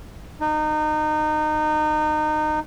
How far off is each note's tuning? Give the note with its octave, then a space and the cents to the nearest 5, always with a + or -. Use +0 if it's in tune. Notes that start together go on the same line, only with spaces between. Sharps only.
D#4 -25